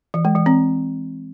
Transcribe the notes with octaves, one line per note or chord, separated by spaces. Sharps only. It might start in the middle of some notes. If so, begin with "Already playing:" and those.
E3
G#3
E3
C4